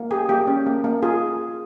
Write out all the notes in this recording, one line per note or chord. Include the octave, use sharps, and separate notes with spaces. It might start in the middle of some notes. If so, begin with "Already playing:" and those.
Already playing: A#3
G4 G#4
A#3 G4
C#4
A#3
A#3
F4 G#4